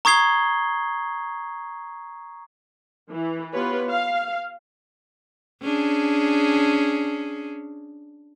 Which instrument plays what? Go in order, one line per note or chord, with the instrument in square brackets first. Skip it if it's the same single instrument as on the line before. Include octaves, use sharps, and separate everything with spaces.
[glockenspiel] A#5 C#6 D#6 G#6 C7 G7
[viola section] E3
B3 F4 G4 B4 C#5
F5
[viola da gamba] C#4 D4 G#4